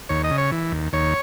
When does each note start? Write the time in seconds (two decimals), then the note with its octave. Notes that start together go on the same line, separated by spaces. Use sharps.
0.09 D#2 C#5
0.24 D#5
0.31 C#3
0.38 C#5
0.52 E3
0.72 D#2
0.93 D#2 C#5